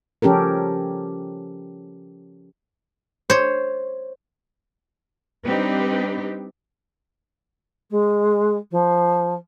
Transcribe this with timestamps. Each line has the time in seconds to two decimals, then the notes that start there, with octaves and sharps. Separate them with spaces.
0.22 F3 C#4 G4 A4 A#4
3.30 C5 C#5
5.47 G3 C4 D4 D#4 G4 B4
7.90 G#3
8.71 F3